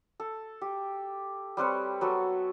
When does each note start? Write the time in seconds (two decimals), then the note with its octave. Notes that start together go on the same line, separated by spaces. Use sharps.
0.20 A4
0.61 G4
1.57 G3 C4 B4 C#5
2.01 F#3 B3 A4